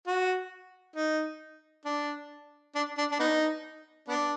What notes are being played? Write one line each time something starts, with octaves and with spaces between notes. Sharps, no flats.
F#4
D#4
D4
D4
D4
D4
B3 D#4
B3 D4